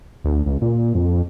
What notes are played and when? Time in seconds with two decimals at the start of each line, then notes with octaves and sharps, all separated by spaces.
0.24 D2
0.46 C#2
0.62 A#2
0.95 F2